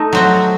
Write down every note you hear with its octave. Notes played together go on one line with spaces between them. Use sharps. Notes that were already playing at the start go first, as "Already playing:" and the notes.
Already playing: A3 D#4
F#3 C4 F#4